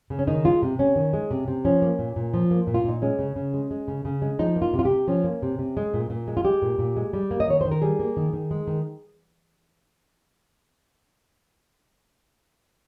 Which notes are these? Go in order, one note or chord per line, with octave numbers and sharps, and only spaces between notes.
C#3
C#4
D#3 D#4
G#3 F4
C3
C3 C#4
D#3
G#3
C3
C3
F3 C#4
A#3
A#2
A#2
F3
A#3
A#2
F4
A#2 D#4
G#3 C#4
C#3
C#3
G#3
G#3
C#3
C#3
G#3
F3 D#4
A#3
F4
C3
F4
G4
C3
F3 C#4
A#3
C3
C3
G#3
A#2
A#2
G#3
F4
G#3 G4
A#2
A#2
G#3
G3
A#3
D#5
D#3 C#5
D#3 C5
A#4
G3 G#4
A#3
D#3
D#3
G#3
D#3